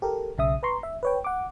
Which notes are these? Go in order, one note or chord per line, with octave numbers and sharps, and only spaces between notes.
G4 A4 A#4
B1 C#3 E5 D#6
B4 A#5 C6 C#6
E5
B4 C#5 G5
F#5 D6